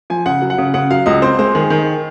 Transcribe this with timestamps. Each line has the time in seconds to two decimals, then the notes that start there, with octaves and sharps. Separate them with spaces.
0.10 F3 G#5
0.26 C#3 F#5
0.42 F#3
0.50 F#5
0.58 C#3
0.74 C#3 F#5
0.90 F#3 F5
1.06 C#2 D#5
1.22 C4 C5
1.38 G#3 C5
1.55 D#3 G#4
1.70 D#3